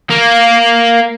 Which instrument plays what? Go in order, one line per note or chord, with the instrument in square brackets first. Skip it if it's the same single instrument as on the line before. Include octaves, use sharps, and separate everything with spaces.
[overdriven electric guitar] A#3